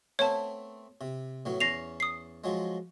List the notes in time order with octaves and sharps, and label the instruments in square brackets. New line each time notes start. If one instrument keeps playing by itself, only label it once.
[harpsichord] A3 B3 C4 [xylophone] C#5 A5
[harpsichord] C3
A2 F#3 B3
[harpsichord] E2 C#4 [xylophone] A#6 C7 F7
[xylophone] D#6 C7
[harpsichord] F3 F#3 G#3